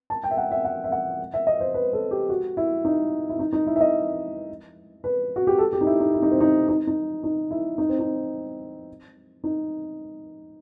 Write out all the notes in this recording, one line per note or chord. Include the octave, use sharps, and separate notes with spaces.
A5
G5
E5
F#5
E5
F#5
E5
F#5
E5
D#5
C5
B4
A4
G4
F#4
E4
D#4
E4
D#4
D#4
E4
E5
D#5
B4
F#4
G4
A4
G4
D#4
E4
D#4
E4
D#4
C4
D#4
D#4
D#4
D#4
E4
D#4
C4
D#4
D#4